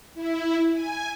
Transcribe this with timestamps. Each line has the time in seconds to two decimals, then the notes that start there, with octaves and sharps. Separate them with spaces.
0.14 E4
0.73 G#5